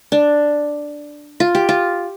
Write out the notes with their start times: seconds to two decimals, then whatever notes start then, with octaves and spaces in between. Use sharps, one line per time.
0.12 D4
1.40 F4
1.55 G4
1.69 F4